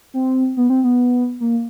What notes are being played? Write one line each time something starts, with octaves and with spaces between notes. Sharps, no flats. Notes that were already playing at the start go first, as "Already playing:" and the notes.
C4
B3
C4
B3
A#3